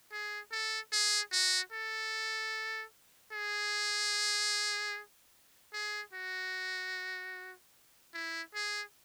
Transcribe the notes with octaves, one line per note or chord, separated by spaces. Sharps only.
G#4
A4
G#4
F#4
A4
G#4
G#4
F#4
E4
G#4